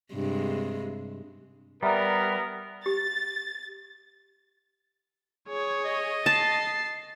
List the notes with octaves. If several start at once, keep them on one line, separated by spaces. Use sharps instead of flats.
G2 C3 G#3
G3 B3 A#4 E5 A#5
G4 A6
G#4 C#5
D#5
A5 A6 C7